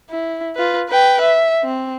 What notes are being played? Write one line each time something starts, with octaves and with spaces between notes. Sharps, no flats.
E4
F4 B4
B4 G5
E5
C4